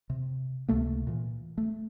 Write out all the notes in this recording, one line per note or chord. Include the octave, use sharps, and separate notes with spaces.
C3
C#2 C3 A3 A#3
A#2 E3
A3